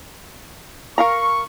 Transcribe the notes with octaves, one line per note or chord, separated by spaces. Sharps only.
A#4 F5 A#5 C#6